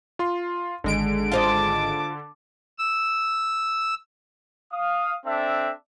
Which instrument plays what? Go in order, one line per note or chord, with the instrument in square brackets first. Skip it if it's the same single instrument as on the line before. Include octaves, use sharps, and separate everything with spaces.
[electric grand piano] F4 C6
[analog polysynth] G#1 G#3 D7 [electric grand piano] D3
[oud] F4 C5 D#5 [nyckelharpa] A5 D6
[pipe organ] E6
[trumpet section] F5 D#6
C4 D4 A4 E5